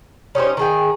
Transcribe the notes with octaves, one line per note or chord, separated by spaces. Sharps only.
C#4 D#4 G4 C5
D#3 G#4 G5